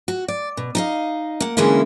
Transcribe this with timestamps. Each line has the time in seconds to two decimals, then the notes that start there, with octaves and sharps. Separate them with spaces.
0.08 F#4
0.28 D5
0.57 B2
0.75 D#4 D#5 F5
1.40 A#3 F#5
1.57 D3 E3 G#3 A#3 C#4 E4